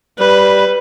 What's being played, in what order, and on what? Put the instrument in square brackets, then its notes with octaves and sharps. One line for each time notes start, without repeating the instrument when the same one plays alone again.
[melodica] G3 [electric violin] B4